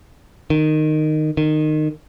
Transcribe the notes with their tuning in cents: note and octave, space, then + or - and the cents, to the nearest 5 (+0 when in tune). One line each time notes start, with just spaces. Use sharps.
D#3 -15
D#3 -20